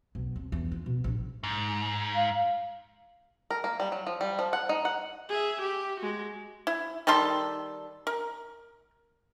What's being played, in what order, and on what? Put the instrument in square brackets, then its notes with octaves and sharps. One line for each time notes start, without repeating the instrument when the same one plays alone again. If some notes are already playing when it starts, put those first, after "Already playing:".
[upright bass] B1
F2
E2
F4
B2
A#1
[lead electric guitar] G#2
[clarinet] F5
[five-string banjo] A#4
A#3
G3
F#3
F3
G3
F3
F#5
D#4
F#5
[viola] G#4 E5
G4
G#3 F#4
[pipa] E4
D#3 G3 A4 C6
A#4